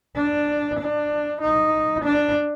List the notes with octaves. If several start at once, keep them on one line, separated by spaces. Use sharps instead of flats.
D4
D4
D#4
D4